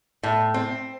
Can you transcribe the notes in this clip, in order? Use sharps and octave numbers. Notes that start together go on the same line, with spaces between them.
A2
C4